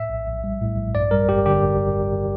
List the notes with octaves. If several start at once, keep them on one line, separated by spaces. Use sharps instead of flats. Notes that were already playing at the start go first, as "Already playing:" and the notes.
Already playing: A2 E5
A#1
A#1
G3
A2
A#1
G2 D5
G3 A#4
G1 G4
D3 G4